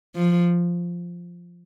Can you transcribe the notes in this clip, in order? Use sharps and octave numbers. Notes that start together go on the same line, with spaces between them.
F3